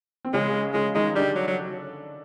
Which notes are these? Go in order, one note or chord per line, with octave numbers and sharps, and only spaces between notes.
C4
C#3 G#3 C#4
C#3 G#3 C#4
D#3 G#3 D#4
D3 G3 D4
F#3
F#3